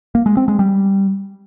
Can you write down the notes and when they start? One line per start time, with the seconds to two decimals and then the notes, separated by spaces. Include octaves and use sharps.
0.15 A#3
0.26 G#3
0.37 C4
0.48 G#3
0.59 G3